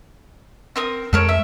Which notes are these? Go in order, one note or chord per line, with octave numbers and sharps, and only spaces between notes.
C4 A#4 D#6
F2 G#3 A4 A#4 C#5
E5